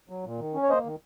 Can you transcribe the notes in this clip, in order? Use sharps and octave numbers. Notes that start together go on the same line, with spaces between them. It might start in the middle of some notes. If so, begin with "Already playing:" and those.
F#3
A#2
D#3
C#4
C#5
A#3 C5 D#5
D#3